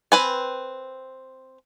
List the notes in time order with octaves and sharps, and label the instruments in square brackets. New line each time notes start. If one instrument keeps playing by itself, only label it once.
[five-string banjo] C4 B4 G#5